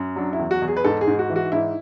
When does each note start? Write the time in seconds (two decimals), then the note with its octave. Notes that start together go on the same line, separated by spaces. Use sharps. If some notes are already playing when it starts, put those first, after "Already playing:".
Already playing: F#2
0.16 F#3 D4
0.33 E4
0.39 E2
0.51 F#4
0.62 E2
0.68 G#4
0.77 B4
0.84 G#2 A4
1.01 G#4
1.07 G#2
1.19 F#4
1.30 E3
1.36 F#4
1.52 G#2 E4